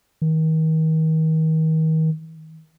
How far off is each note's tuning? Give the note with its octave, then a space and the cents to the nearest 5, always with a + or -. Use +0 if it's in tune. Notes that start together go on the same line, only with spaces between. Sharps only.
D#3 +35